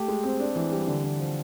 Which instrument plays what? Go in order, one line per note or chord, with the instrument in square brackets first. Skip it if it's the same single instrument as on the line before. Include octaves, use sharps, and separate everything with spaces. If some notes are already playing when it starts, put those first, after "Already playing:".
Already playing: [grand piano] A3 G4
G#3
C4
D4
E3
G3
D3
D3
F3